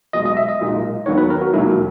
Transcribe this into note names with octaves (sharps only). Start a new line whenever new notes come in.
B1 B2 G#3 D#5
D#5
E5
D#5
B1 A#2 G#3 D#4
D#2 D#3 F#3 B3 C#5
B4
A#4
F#4
E1 D#2 D#3 F#3 A#3 E4